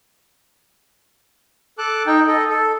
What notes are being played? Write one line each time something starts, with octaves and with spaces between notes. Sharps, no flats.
A4 A5 D6 F#6
D#4 G5
A4 D#5
A4